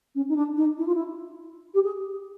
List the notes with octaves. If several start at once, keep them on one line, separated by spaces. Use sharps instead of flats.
C#4
D#4
D4
D#4
E4
F4
E4
G4
G#4